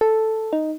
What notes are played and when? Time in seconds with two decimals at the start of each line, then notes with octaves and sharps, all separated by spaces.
0.01 A4
0.53 D#4